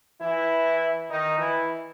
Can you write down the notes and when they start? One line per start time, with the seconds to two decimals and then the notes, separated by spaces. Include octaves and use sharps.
0.21 E3 E4
1.09 D#3 D#4
1.38 E3 E4